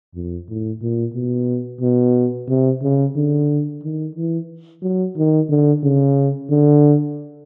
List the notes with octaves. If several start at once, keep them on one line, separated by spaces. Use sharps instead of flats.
F2
A2
A#2
B2
B2
C3
C#3
D3
D#3
E3
F#3
D#3
D3
C#3
D3